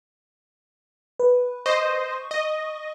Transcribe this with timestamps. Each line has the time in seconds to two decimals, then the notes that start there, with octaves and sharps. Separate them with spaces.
1.19 B4
1.66 C5 D#5 C#6
2.31 D#5